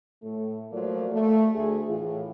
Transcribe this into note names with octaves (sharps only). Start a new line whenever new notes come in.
A2 A3
F3 F#3 A3 A#3 F4 D5
A3
D2 G#4
A2 E3 F4